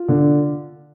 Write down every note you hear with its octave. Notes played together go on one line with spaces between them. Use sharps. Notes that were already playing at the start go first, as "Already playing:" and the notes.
Already playing: F4
D3